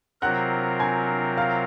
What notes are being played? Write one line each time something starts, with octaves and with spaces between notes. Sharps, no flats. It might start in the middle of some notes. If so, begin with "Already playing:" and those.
C3 F#3 C4 F4 A#4 F#5 F#6
G#5 G#6
F5 F6